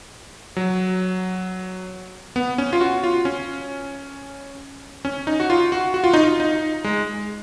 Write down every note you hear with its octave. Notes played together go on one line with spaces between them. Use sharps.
F#3
B3
C#4
F4
F#4
F4
C#4
C#4
D#4
F#4
F4
F#4
F#4
F4
D#4
F4
D#4
G#3